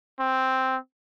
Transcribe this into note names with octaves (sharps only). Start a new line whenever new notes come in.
C4